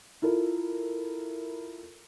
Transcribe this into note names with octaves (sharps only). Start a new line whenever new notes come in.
E4 F4 A4 A#4